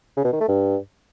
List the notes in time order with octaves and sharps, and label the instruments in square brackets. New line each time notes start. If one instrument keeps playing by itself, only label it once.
[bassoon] C#3
B2
D#3
A3
G2